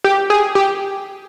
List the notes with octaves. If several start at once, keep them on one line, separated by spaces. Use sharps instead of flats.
G4
G#4
G4